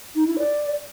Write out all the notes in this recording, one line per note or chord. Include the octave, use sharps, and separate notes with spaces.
D#4
E4
D5